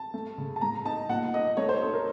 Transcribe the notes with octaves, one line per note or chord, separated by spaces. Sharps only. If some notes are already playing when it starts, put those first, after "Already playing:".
Already playing: A5
A3
C#3
A5
A2 A#5
D#4 A5
A#2 F#5
D#4 D#5
A3 C#5
C5
D#4 A4
A#4